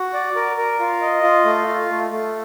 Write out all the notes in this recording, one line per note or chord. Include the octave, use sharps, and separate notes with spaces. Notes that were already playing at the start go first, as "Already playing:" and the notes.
Already playing: F#4
D5
A#4
A#4
F4
D#5
F4
A3
F4
A3
A3